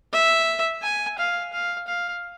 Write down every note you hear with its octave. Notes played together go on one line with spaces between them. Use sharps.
E5
G#5
F5
F5
F5